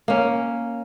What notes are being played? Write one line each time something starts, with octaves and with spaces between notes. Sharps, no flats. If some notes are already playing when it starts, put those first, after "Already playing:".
A#3 C#4